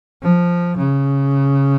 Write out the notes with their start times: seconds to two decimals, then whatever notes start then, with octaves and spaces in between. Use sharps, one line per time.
0.22 F3
0.78 C#3